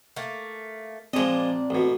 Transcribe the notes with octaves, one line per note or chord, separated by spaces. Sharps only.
A3 A#3
A#2 F3 G#3 C4 D4 D#5
A1 B2